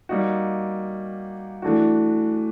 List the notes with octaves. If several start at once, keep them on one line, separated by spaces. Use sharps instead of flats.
G3 A#3 D#4 F#4
E3 A3 D4 F#4